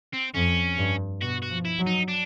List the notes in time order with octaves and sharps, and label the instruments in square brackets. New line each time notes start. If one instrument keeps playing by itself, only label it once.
[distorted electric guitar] C4
[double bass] F2 [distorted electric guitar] C#4
[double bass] G2
[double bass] B2 [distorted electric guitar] F#4
[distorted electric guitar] F#4
[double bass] F3
[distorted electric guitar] E4
[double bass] F#3
[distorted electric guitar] D#4
D4